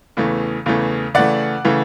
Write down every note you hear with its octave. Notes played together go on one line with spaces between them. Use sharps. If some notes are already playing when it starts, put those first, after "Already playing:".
E2 C#3 E3 A3
E2 C#3 E3 A3
C#3 E3 A3 D5 F#5
C#3 E3 A3